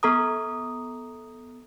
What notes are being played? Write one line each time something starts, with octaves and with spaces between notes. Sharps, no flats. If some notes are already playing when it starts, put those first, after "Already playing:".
B3 A4 A#5 D#6